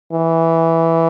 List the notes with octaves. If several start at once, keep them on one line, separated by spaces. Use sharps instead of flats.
E3